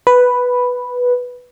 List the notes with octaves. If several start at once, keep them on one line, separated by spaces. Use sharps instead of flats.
B4